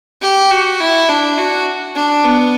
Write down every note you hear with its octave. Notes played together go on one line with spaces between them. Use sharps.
G4
F#4
E4
D4
F#4
D4
B3